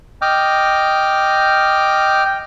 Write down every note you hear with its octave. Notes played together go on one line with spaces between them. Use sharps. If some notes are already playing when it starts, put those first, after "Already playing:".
D#5 G5 D6 F6
G5